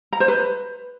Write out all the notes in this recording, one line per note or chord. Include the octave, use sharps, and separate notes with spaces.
A#5
C5
B4